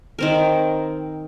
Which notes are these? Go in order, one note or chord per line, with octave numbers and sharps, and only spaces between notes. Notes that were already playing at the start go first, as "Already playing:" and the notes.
D#3 C4 A#4